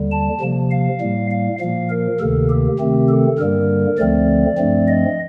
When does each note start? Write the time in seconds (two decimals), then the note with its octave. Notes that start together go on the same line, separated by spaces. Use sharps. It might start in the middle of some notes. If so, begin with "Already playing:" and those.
Already playing: D#2 D3 G3
0.11 A5
0.41 C3 F3 A#3
0.71 F5
1.01 A2 G3 A#3
1.31 F5
1.60 A#2 F3 A#3 F5
1.90 A#4
2.20 D2 C3 D#3 A#3 A4
2.50 G4
2.80 C3 D#3 A3 C4
3.09 A4
3.39 G2 D3 G3 A#3 A#4
3.98 D2 D3 F3 A3 C4 D5
4.58 G2 F3 A3 C4
4.88 D#5